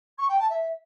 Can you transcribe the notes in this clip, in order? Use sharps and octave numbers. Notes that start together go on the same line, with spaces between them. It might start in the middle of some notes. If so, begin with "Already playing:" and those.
C#6
G5
A5
E5